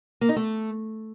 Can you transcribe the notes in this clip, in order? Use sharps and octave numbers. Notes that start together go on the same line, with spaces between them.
A#3
D#4
A3